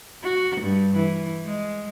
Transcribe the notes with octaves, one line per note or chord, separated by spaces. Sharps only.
F#4
G2
E3
G#3